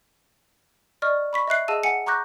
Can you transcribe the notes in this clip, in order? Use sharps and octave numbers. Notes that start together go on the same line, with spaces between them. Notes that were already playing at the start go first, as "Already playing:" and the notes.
D5 D#5 C#6 F6
B5 C#6 B6
D#5 E5 F#6 C7
G#4 D#5 F5 A5 E6 D#7
F#5 G#5 C#7
A#5 C#6 D6 F#6 G6 A#6